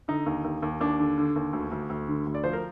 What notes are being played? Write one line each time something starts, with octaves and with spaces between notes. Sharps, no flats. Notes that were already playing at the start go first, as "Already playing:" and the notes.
D3 D#4
D#2
D#2
D#2
D#2 D4
D3
D3
D#2
D2
D2
D2
D3
D2
D5
F3 C5
A#4